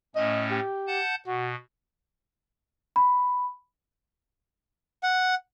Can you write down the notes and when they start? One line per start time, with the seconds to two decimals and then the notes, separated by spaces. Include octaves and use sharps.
0.16 A2 A3 C#4 D#5
0.51 G4
0.87 F#5 A5 G6
1.27 B2 F#4
2.96 B5
5.03 F#5